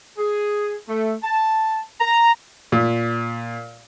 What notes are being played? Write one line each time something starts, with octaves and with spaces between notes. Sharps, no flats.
G#4
A3
A5
A#5
A#2